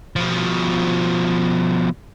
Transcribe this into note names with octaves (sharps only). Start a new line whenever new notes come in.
B2 F3